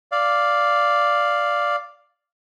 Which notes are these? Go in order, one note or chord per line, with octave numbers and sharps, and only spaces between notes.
D5 F5